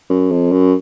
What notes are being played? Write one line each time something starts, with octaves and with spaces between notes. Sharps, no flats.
F#2
F2
F#2